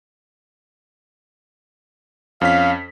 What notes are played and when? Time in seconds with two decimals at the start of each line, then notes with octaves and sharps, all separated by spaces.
2.41 F2 C#4 F5 B6